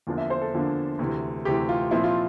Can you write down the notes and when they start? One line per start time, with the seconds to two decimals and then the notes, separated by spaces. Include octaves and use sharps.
0.07 E2 D3 F3 A#3 D4
0.18 E5
0.30 C5
0.41 A4
0.54 E2 D3 F3 A#3 D4
0.99 D2 C3 E3
1.45 D2 C3 E3 G4
1.69 F4
1.91 A#2 F3 C4 E4
2.04 F4